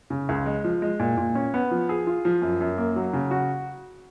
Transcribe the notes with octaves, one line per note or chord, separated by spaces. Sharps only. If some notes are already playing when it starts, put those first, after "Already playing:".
C#3
C#2
G#3
F3
G#3
A#2
A#2
C#4
B3
F3
G#4
F4
F3
F#2
F#2
A#3
F#3
C#3
F#4